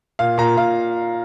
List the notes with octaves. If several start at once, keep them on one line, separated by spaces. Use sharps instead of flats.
A#2 F5
A#2 A#5
A#2 F5